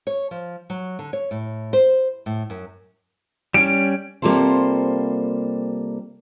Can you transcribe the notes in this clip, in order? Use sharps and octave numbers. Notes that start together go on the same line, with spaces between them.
C#5
F3
F#3
D3
C#5
A2
C5
A2
F#2
G3 C#4 D7
C3 G3 A#3 F4 A4 C5